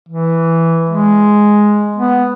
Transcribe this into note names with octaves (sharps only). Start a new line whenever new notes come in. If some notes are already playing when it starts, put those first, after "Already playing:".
E3
G#3
B3